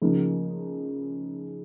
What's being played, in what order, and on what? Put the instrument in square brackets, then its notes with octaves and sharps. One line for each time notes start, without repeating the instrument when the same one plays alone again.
[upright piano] C#3 F3 A#3 D#4